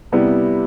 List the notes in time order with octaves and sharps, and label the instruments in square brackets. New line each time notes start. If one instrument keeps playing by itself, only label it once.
[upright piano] C3 G3 B3 E4 G4